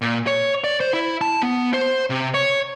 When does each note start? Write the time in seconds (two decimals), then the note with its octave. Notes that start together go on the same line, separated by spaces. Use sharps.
0.02 A#2
0.27 C#5
0.64 D5
0.80 C5
0.94 E4
1.21 A5
1.43 B3
1.74 C5
2.10 C3
2.34 C#5